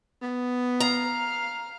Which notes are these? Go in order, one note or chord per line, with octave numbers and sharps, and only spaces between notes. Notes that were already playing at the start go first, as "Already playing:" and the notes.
B3
F5 A#5 F6